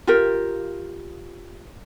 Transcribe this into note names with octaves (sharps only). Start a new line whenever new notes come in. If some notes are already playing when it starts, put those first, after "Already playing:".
F4 G4 A#4